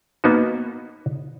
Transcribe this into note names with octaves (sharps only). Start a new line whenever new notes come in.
A#3 B3 D#4 F#4